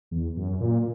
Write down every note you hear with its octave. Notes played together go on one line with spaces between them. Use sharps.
E2
F#2
A#2